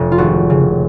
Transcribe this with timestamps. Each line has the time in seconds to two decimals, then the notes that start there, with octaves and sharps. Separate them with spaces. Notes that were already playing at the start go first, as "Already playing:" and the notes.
Already playing: F1
0.12 F4
0.18 G#1 F#4
0.50 C#3